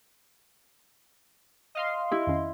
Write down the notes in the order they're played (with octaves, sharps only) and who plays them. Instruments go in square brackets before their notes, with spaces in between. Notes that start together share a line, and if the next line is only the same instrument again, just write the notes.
[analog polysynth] D#5 F5 C6
[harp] E4 [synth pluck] G4
[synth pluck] F2 D#3 C#4